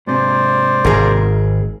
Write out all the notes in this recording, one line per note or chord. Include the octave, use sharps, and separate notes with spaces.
G#2 C3 C5 D5
G#1 G#4 A#4